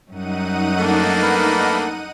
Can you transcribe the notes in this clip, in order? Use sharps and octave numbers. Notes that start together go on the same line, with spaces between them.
F#2 G3 D#4 F#5 D#7
A3 A#3 D4
A#4 B4